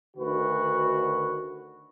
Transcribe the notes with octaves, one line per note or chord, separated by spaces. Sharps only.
D2 D3 D#3 F#4 B4